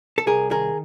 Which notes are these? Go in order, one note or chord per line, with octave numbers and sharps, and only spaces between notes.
A4
C2 G#4 A#4
D#3 G#4 A#4